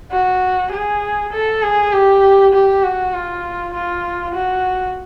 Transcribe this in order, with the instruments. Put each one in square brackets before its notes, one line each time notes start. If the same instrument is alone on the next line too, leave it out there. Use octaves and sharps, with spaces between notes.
[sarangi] F#4
G#4
A4
G#4
G4
G4
F#4
F4
F4
F#4